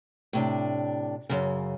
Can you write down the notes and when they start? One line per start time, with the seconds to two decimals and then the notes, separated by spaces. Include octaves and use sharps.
0.33 A2 C3 D4
1.29 F#2 C#3